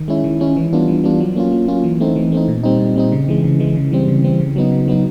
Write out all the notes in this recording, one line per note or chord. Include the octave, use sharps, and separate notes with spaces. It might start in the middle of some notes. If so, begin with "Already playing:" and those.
Already playing: D#3
G#3 C#4 E4
D#3
G#3 C#4 E4
E3
G3 B3 D4 F4
E3
G3 B3 D4 F4
F#3
A#3 C#4 F4
F#3
A#3 C#4 F4
E3
A3 C4 D#4
E3
A3 C4 D#4
A#2
G3 C4 D#4
A#2
G3 C4 D#4
C#3
E3 G#3
C#3
E3 G#3
C#3
E3 G3 C4
C#3
E3 G3 C4
C#3
F#3 B3 D#4
C#3
F#3 B3 D#4